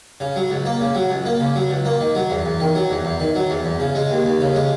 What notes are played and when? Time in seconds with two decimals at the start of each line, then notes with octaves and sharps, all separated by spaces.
0.20 C#3
0.36 F#3
0.50 C#2
0.66 A#3
0.81 C#3
0.95 F#3
1.10 C#2
1.25 A#3
1.40 C#3
1.56 F#3
1.70 C#2
1.85 A#3
2.00 D#3
2.15 F#3
2.30 E2
2.45 E2
2.60 D#3
2.75 F#3
2.90 E2
3.05 E2
3.20 D#3
3.35 F#3
3.50 E2
3.65 E2
3.80 C#3
3.95 G#3
4.10 D#2
4.25 D#2
4.40 C#3
4.55 G#3